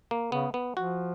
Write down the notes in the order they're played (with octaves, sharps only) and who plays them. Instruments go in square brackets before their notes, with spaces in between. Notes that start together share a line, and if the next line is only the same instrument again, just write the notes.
[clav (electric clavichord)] A#3
[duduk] C#3 [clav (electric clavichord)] B3
[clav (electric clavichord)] B3
[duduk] F3 [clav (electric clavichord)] F#4